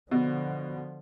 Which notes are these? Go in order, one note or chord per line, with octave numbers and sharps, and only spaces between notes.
B2 D3 F3